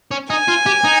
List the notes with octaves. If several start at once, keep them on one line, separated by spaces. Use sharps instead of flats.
C#4
D#4 G#5
F4
G4
D#4